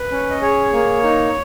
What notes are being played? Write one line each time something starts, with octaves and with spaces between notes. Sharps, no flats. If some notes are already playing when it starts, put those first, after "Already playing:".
Already playing: B4
C#4
D#5
G#4 C#5
A#3
D#4